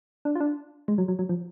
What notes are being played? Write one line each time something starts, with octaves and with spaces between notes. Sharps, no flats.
D4
F4
D4
G#3
F#3
F#3
F#3
F3